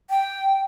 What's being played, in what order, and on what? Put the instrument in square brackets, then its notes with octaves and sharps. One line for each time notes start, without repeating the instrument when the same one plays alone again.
[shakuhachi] G5